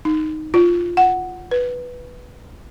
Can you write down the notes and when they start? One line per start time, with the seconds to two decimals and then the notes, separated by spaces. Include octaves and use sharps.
0.05 D#4
0.54 F4
0.97 F#5
1.51 B4